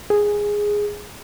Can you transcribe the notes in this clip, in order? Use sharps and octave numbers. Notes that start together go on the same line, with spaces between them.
G#4